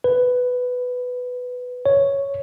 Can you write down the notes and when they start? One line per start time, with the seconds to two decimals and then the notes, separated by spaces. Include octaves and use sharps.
0.04 B4
1.86 C#5